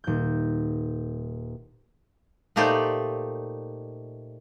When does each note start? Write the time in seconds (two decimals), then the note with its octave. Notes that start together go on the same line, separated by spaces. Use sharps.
0.04 D#1 G6
2.56 A#2 A3 D#4 G4 C5 D5